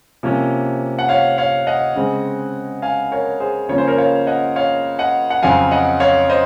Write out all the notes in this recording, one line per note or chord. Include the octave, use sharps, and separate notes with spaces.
C3 F3 A#3 C#4
F#5
C#5 F5
C#5 F5
D#5 F#5
C#3 G#3 C4
F5 G#5
A#4 C#5
G#4 C5
C#3 F3 A#3 C#4 C#5
C5
A#4 C#5
C#5 F5
D#5 F#5
C#5 F5
D#5 F#5
F#5
F2 C#3 F#3 F5 G#5
D#5 F#5
C#5 F5
C5 D#5